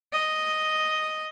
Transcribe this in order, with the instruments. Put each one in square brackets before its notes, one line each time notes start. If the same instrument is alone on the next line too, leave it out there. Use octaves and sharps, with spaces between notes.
[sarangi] D#5